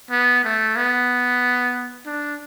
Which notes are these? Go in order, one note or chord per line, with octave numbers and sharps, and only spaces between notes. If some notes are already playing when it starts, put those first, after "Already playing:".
B3
A3
B3
D4